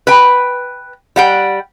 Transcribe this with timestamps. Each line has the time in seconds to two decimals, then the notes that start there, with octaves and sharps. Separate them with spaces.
0.07 B4 G5
1.16 G3 F#5 G5